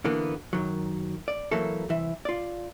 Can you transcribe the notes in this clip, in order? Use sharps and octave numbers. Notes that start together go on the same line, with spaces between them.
B2 D3 E3 A#3 B3
F#2 D#3 F#3
D5
E2 E3 F#3 A3 A#3 A4
C2 E3 E5
F4 D5